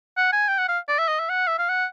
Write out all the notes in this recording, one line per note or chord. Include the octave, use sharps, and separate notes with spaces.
F#5
G#5
G5
F#5
F5
D5
E5
D#5
E5
F#5
E5
F5
F#5